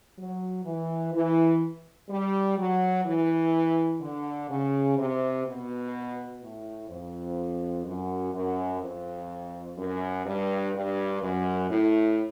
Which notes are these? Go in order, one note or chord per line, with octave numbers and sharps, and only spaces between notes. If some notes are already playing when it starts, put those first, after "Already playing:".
F#3
E3
E3
G3
F#3
E3
D3
C#3
C3
B2
A2
F2
F#2
F#2
F2
F#2
G2
G2
F#2
A2